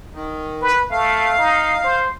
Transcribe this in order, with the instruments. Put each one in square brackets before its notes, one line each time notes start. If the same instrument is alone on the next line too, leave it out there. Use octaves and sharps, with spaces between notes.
[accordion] D#3
[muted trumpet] B4
[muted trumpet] A3 [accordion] F5
[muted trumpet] D#4
C5